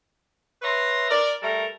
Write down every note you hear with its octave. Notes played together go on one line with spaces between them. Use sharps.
B4 C#5 E5 A#5 C6
A#4 D5
G3 A3 A4 A#4